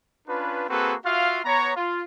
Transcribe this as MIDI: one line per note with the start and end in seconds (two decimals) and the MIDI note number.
0.28 0.65 61
0.28 0.65 62
0.28 0.65 65
0.28 0.65 71
0.69 0.95 58
0.69 0.95 60
0.69 0.95 66
0.69 0.95 68
0.69 0.95 69
0.69 0.95 71
1.05 1.40 65
1.05 1.40 66
1.05 1.40 76
1.05 1.40 77
1.45 1.75 59
1.45 1.75 73
1.45 1.75 82
1.76 2.03 65